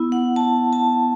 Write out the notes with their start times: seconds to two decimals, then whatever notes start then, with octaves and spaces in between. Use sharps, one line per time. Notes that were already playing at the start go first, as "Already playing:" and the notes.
Already playing: B3 E4
0.12 F#5
0.36 A5
0.73 A5